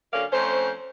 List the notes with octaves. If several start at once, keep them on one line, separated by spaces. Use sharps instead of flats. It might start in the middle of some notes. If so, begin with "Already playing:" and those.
D3 F#3 A#3 C#4 D5 F5
F2 A3 C#4 C5